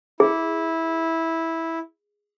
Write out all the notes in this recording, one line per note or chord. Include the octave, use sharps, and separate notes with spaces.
E4 G#4